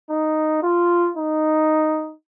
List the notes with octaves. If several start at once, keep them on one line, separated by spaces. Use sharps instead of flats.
D#4
F4
D#4